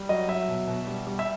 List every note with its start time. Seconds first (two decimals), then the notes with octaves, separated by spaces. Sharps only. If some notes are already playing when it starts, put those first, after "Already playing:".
Already playing: G3
0.09 F#3 D#5
0.28 F#3 E5
0.48 B2
0.67 B2
0.87 G3
1.07 G3
1.19 E5